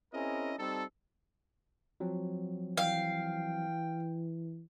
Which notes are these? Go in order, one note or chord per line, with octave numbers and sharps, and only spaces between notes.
C4 C#4 E4 G#4 A#4 D#5
G3 C4 D#4 A4
F3 F#3 C4
E3 F5 G5